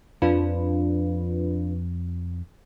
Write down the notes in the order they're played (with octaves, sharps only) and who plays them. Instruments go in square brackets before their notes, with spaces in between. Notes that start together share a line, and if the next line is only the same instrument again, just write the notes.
[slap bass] F2 F3 [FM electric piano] D4 F4 B4